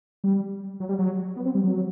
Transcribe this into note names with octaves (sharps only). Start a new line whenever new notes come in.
G3
F#3
G3
F#3
B3
C4
G3
F#3